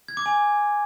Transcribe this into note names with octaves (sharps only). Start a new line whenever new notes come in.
G#6
D6
G#5